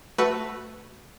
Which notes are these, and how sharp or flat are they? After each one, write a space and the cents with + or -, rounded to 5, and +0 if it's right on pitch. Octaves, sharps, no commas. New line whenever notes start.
A3 +0 F#4 +0 B4 +0